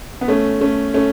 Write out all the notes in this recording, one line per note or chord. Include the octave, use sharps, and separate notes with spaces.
B3
A3 C#4
A3 C#4
A3 C#4